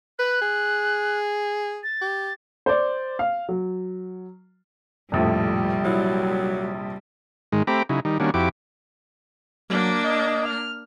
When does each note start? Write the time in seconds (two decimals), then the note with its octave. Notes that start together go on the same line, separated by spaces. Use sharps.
0.19 B4 F#6
0.42 G#4
1.83 A6
2.01 G4
2.66 C5 D5
3.19 F5
3.49 F#3
5.12 F1 A#1 F2 A2 F3 G3
5.85 F#3 E4
7.52 G#2 D#3 G#3
7.67 A3 C4 G4 A#5 B5 D6
7.89 C#3 F#3 D#4 E4
8.05 D#3 G3 D#4
8.20 D#3 G3 A#3 C#4 D4 F#4
8.34 F2 E4 F#4 G4 D6
9.69 F#3 A#3 D4
10.04 D#5
10.46 F6